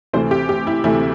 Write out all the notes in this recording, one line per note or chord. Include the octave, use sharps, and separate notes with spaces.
D2 C3 E3 A3 C4 C5
G4
G4
E4
D2 C3 E3 A3 C4 E4